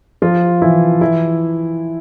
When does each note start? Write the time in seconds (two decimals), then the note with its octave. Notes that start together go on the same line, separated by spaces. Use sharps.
0.22 F3 F4
0.62 E3 E4
1.01 E3 E4